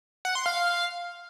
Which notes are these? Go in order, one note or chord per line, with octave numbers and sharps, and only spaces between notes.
F#5
C6
F5